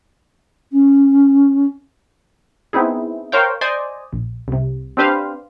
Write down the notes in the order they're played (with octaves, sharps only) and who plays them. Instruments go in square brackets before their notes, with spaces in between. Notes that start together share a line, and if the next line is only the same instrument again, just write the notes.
[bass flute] C#4
[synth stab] B3 C4 D#4 E4 G#4
A#4 C5 C#5 F5 G5
C5 D5 D#5 G#5
A#1
C2 C3
C4 D4 G4 B4 C5 F5